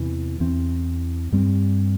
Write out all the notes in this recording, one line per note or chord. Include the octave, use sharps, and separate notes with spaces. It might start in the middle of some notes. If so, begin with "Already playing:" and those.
Already playing: E2 C3 E3
E2 E3 C4
G2 G3 C4